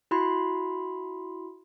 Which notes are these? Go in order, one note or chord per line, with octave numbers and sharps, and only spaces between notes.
E4 F#4 B5 C6